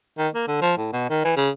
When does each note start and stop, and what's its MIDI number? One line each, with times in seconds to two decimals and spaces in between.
0.18 0.29 51
0.35 0.46 58
0.48 0.58 50
0.62 0.73 53
0.77 0.91 45
0.93 1.07 47
1.10 1.22 51
1.25 1.34 52
1.37 1.50 49